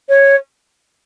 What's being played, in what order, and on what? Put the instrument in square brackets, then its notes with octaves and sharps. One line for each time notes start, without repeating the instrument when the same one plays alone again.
[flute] C#5